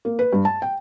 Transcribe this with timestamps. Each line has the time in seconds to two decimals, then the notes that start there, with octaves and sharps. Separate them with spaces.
0.05 A#3
0.19 B4
0.33 G2
0.45 A5
0.62 G5